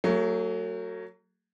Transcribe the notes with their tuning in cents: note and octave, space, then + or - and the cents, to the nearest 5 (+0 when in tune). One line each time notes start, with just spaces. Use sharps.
F#3 +0 A3 +45 G#4 +0